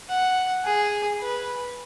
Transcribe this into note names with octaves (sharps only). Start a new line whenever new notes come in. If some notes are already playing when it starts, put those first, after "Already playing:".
F#5
G#4
B4